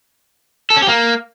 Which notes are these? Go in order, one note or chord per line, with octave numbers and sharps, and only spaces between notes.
A4
C#4
G4
A#3